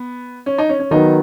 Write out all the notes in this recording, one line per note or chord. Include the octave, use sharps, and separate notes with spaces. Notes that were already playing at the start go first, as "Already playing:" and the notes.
Already playing: B3
C#4
D#4
C#4
C#4
D#3 F#3 B3 D#4